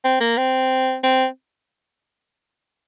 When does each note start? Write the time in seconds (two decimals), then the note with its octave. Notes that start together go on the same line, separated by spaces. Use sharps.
0.05 C4
0.21 A#3
0.37 C4
1.04 C4